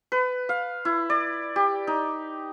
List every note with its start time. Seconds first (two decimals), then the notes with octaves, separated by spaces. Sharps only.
0.12 B4
0.49 F5
0.85 E4
1.10 D5
1.56 G4
1.87 D#4